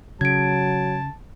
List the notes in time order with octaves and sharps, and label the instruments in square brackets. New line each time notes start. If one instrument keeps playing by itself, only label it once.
[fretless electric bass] C#3 [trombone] F#3 [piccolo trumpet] A5 [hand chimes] G#6 D7